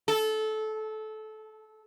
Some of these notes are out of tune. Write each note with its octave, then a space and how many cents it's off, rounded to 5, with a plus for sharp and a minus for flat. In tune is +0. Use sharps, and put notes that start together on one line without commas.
A4 -20